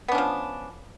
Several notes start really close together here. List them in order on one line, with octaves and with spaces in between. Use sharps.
B3 D4 C#4 F3